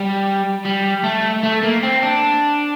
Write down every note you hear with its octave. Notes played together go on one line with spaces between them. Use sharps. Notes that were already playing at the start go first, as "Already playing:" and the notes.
Already playing: G3
G3
A3
A3
A#3
C4
D4